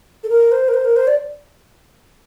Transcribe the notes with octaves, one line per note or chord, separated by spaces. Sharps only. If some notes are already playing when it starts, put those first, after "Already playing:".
A4
A#4
C5
A#4
C5
A#4
C5
D5